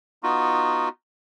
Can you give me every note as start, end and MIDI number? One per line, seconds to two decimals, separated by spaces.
0.23 0.89 59
0.23 0.89 63
0.23 0.89 65
0.23 0.89 66